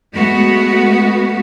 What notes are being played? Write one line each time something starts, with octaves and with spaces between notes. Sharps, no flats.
G#3 A3 B3 F#4